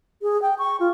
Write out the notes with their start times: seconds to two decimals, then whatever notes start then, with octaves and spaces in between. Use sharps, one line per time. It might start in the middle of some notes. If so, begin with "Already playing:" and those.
0.22 G#4
0.41 G5
0.58 C#6
0.79 F4